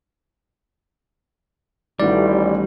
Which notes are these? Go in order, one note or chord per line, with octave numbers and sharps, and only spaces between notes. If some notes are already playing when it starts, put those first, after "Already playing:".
A1 A2 D#3 G3 F#4 D5